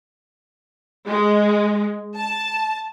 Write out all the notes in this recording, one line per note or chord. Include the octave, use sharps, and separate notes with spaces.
G#3
A5